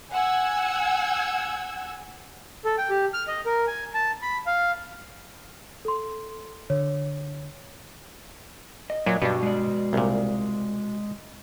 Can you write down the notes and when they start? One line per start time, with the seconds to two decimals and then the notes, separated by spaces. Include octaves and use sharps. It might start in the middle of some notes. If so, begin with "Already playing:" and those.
0.13 F#5 G#5 E6 G#6
2.65 A4
2.78 G5
2.90 G4
3.14 F6
3.28 D#5
3.46 A#4
3.67 G#5
3.94 A5
4.22 B5
4.47 F5
5.85 A4 C6
6.70 D3 C#5
8.90 D#5
9.06 A#2 F#3
9.22 G2 B2 D4
9.43 G#3 D5
9.93 C2 A#2